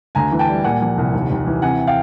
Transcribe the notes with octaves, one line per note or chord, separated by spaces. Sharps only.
D2 G#5 A#5
E3
G5 A5
G3
A#2 F#5 G#5
F3
C2
D#2
D#2
E3
C3 F#5 G#5
F5 G5